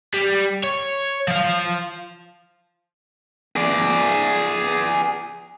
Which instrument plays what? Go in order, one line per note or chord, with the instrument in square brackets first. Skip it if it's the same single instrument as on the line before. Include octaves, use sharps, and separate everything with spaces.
[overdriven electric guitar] G3
C#5
F3 F5
[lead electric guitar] G#4 D5